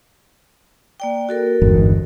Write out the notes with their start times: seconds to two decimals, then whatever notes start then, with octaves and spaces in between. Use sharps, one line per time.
1.00 A#3 D5 G5
1.29 F#4 A4 A#4
1.62 G1 E2 G#2